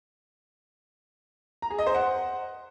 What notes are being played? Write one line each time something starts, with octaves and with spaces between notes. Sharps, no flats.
A#5
G#4
D#5
C5
F#5